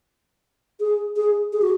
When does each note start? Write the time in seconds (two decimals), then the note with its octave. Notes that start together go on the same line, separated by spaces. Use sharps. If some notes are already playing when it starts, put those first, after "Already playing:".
0.80 G#4
1.17 G#4
1.53 G#4
1.62 F#4